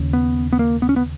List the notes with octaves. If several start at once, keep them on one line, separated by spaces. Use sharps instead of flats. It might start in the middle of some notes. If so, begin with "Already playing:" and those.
Already playing: D#2 C#3
B3
B3
A#3
B3
C#4
B3